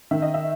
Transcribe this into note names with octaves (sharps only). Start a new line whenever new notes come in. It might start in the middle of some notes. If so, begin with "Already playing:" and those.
D#3 E5
D#5
E5